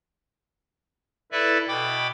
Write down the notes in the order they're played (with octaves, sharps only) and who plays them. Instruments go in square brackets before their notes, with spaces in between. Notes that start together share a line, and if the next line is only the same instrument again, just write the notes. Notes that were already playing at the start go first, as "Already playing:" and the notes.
[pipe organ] E4 A4 B4 D5 E5
B2 G5 B5 D6